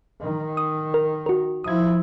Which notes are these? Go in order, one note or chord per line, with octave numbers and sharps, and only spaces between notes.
D#3
D#6
A#4
F#4 A#4
F3 E4 D#6 G#6